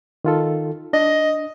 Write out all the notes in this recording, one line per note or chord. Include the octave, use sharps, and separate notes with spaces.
D#3 F4 A4
D4 D#5